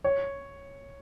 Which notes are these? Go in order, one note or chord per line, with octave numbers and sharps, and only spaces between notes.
C#5